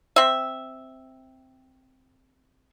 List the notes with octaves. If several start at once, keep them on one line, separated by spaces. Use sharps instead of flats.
C4 E5